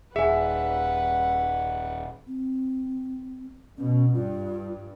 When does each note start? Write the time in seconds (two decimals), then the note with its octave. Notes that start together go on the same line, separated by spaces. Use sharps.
0.16 D#1 G#4 B4 E5 F#5 G#5
2.27 C4
3.78 B2 C#4
4.14 G2 F4